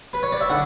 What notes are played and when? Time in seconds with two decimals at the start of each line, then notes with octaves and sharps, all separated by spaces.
0.13 B4
0.23 C#5
0.32 D5
0.41 E5
0.50 D3 F#5